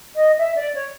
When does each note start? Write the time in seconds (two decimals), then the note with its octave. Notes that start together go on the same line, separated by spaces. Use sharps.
0.15 D#5
0.38 E5
0.56 D5
0.73 C#5